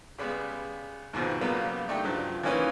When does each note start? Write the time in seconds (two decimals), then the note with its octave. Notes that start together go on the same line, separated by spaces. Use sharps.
0.18 C#3 G3 G#3 B3
1.13 D#2 G#2 B2 F3 C4
1.41 C#3 F#3 G3 A#3 B3
1.89 A3 D4 D#4 G4
2.04 G2 C#3 F3 F#3
2.43 E3 F3 A#3 C#4 D#4 B4